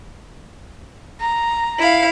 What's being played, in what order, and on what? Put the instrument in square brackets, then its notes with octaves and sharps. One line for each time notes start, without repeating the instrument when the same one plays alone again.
[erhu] A#5
[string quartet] E4 F5